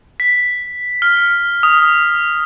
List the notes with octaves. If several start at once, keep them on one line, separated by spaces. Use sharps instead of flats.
B6
F6
D#6